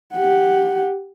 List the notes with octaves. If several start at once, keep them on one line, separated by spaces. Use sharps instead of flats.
G4 F#5